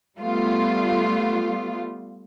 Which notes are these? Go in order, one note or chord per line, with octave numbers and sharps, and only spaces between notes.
G3 A3 B3 F4